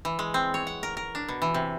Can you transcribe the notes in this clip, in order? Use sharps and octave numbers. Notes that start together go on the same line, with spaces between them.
E3
G#3
C4
C#5
F#5
A#4
A#4
D4
B2
E3
C3